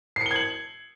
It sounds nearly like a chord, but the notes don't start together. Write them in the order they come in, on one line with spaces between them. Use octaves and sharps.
C7 C#7 G7 G#6 F#7